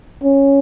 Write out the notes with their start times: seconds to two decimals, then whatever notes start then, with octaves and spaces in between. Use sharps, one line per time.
0.23 C#4